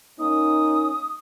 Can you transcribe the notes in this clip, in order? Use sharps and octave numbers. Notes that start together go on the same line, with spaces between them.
A#3 C#4 D#4 D#6